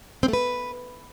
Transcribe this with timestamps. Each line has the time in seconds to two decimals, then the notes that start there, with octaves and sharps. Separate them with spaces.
0.23 C4
0.28 A3
0.33 B4